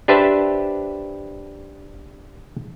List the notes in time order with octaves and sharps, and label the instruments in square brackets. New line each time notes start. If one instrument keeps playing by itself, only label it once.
[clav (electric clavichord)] D4 G4 B4 C5 E5 A5